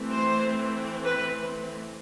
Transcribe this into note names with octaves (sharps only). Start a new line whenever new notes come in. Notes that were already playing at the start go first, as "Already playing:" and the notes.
Already playing: E3 A3 C4
C5
B4